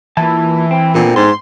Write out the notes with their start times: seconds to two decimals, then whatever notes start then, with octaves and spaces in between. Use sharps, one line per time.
0.17 A#2 E3 A5
0.71 C4
0.95 A#2 D3 B3 C4
1.16 G#2 C6